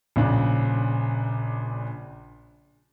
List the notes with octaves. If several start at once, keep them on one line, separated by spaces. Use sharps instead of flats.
A#1 C#3 D4